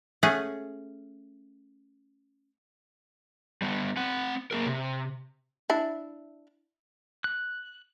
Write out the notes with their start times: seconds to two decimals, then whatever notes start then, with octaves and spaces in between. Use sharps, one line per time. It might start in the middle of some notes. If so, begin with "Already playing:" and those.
0.23 A3 C#4 G#4 F#5
3.62 G3 B3
3.97 C4 F#5
4.51 A#3 G#4 A#4
4.66 C3
5.70 D4 E4
7.24 F#6